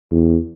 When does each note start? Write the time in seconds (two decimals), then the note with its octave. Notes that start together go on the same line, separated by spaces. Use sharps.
0.11 E2